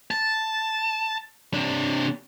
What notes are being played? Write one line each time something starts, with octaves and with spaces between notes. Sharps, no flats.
A5
C3 D4